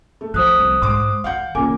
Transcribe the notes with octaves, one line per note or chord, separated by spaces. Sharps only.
A3
F3 C5 D#6 F#6
C2
G#2 C6 D6
D#3 F5 F#5 G6
A#2 C#3 E3 A#3 G#5 D6